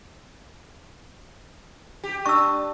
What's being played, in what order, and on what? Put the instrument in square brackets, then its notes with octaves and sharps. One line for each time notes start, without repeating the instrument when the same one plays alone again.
[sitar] G4
[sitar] D4 [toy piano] C#6 E6